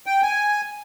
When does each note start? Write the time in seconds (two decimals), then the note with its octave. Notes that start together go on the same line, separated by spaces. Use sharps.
0.06 G5
0.23 G#5